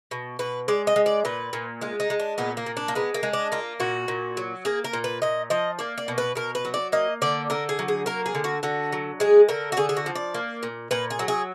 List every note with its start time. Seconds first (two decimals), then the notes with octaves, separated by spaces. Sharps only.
0.11 B2
0.39 B2 B4
0.68 G#3 D5
0.87 D#5
0.96 G#3
1.06 D5
1.25 A#2 B4
1.53 A#2
1.81 G#3 F4
2.00 D#4
2.10 G#3
2.20 D4
2.38 A#2 B3
2.57 A#3
2.66 A#2
2.77 D4
2.88 A#3
2.95 G#3 B3
3.14 A#3
3.23 G#3
3.33 D4
3.52 A#3 F4
3.80 A#2 F#4
4.08 A#2
4.37 F#3
4.65 A#3 G#4
4.84 A#4
4.93 A#2
5.04 B4
5.22 A#2 D#5
5.50 F3 D#5
5.79 A#3 D5
5.98 D5
6.08 B2
6.18 B4
6.35 B2 A#4
6.55 B4
6.65 F#3
6.74 D5
6.92 A#3 D#5
7.22 D3 D5
7.50 D3 A#4
7.69 G#4
7.79 F#3
7.88 G#4
8.06 A#3 A#4
8.26 G#4
8.35 D3
8.44 F#4
8.63 D3 F#4
8.92 F#3
9.20 G#3 G#4
9.49 D3 A#4
9.72 F#4
9.77 D3 G#4
9.89 G#4
9.97 F#4
10.06 F3
10.15 D5
10.34 A#3
10.63 A#2
10.91 A#2 B4
11.10 G#4
11.19 F#3
11.28 G#4